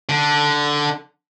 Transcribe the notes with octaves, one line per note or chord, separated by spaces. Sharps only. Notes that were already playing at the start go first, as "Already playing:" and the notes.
D3